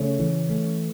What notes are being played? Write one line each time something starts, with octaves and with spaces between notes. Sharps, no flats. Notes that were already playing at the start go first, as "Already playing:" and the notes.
Already playing: C#3 A3 C#4
E3
A3